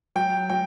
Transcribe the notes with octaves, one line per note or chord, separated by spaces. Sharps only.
F#3 G5
F#3 G5